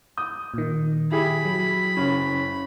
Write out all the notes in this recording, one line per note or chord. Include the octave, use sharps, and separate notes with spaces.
D#6 G6
A#2 D#3
E4 G4 G#4 B5
F#3
F#1 C#4